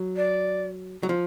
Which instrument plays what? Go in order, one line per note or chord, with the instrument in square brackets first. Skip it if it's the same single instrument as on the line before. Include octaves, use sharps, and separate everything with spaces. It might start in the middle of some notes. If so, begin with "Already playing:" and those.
Already playing: [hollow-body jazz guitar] F#3
[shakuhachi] D5
[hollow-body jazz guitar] F#3
F3